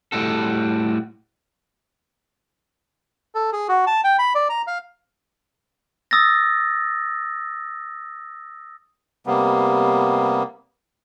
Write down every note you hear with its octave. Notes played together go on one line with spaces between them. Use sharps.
A2 G3 F#4 A4
A4
G#4
F#4
A5
G5
B5
D5
A#5
F5
D#6 E6 A6 A#6
C3 G3 A#3 B3